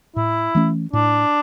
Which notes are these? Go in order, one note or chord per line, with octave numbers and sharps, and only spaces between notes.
A2 E4
E3 A3 C#4
A2 D4